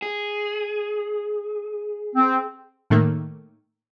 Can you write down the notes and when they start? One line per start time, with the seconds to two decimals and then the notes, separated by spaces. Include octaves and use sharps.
0.02 G#4
2.16 C4
2.90 A2 D#3 A3 A#3